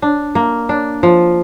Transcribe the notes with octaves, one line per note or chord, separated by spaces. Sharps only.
D4
A#3
D4
F3